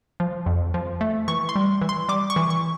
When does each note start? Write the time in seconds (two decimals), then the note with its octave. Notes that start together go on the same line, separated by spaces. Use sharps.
0.20 F3
0.46 F2
0.74 F3
1.01 A3
1.28 E3 C#6
1.49 C6
1.56 G3
1.82 E3
1.89 C6
2.09 G3 D6
2.30 C#6
2.36 E3
2.50 C#6